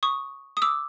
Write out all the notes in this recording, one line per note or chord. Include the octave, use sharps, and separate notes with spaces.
C#6 D#6
D#6
D6 E6